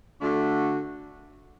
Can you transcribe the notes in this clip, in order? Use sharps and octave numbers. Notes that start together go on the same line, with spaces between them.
D3 A3 D4 F#4